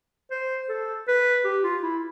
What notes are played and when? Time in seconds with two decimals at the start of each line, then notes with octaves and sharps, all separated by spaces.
0.31 C5
0.69 A4
1.08 B4
1.45 G4
1.63 F4
1.83 E4